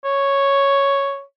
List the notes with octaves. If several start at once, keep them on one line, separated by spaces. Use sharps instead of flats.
C#5